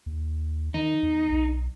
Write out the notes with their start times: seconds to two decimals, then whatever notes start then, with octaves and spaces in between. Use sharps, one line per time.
0.06 D#2
0.74 D#3 D#4
1.03 E2
1.30 B1